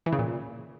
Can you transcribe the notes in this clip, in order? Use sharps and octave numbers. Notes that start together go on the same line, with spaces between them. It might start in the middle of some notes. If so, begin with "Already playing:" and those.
E3
C#3
A#2